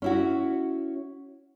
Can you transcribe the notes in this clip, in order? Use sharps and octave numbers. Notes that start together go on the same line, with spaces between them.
C#4 E4 F#4